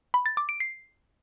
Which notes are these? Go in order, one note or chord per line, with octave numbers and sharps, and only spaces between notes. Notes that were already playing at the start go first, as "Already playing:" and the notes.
B5
A6
D6
D7
C7